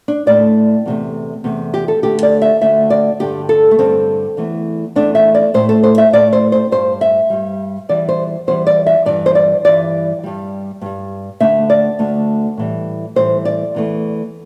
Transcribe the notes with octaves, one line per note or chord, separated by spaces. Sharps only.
D4
A2 A3 D5
E2 C3 A3
E2 C3 A3
G4
A4
D2 D3 A3 G4
D5
E5
D2 D3 A3 E5
D5
G2 D3 G3 G4
A4
A3
G2 D3 G3 C4
E2 E3 A3
E2 E3 A3 D4
E5
D5
A2 A3 C5
A4
C5
E5
A2 A3 D5
C5
C5
G2 G3 C5
E5
G2 G3
E2 E3 G3 D5
C5
E2 E3 G3 C5
D5
E5
G2 E3 G3 D5
C5
D5
G2 E3 G3 D5
G2 G3
G2 G3
D2 D3 A3 E5
D5
D2 D3 A3
A2 E3 G3
A2 E3 G3 C5
D5
E2 E3 A3